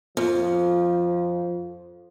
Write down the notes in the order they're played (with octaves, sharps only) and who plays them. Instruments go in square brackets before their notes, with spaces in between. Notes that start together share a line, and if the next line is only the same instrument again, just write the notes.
[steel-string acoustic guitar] F2 [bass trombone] F3